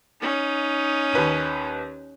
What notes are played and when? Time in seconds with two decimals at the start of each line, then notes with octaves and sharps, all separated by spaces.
0.21 C#4 D#4
1.13 D#2 B4 D#7